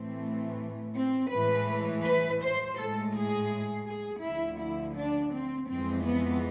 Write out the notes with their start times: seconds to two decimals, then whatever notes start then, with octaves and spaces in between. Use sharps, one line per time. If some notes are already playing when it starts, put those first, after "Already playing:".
Already playing: A2 E3 A3 C4
0.96 C4
1.32 A2 E3 G#3 B4
2.05 B4
2.42 C5
2.78 A2 G#3 A4
3.15 G#4
3.88 G#4
4.24 D2 D3 F3 E4
4.61 E4
4.98 D4
5.34 C4
5.71 F2 E3 G#3 C4
6.07 B3